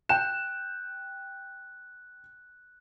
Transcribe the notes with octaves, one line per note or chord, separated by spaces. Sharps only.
G5 F#6 E7